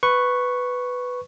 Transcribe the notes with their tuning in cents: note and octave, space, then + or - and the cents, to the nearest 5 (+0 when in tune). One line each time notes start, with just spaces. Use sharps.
B4 +5 C#6 -5